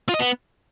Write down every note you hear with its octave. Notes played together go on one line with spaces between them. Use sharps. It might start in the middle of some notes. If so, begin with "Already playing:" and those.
F4
D#5
B3